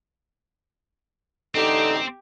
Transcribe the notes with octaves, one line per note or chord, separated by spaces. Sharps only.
A1 D3 C4 D#4 G4 A4